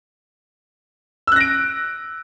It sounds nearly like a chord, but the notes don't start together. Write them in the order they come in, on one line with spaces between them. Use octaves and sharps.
E6 F#6 A#6 D7